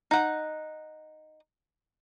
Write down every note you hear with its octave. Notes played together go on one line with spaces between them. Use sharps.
D#4 F#5